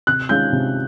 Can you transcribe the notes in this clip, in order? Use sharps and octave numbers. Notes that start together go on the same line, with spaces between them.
C3 F#6
D#3 G#3 C#4 F4 G6
C3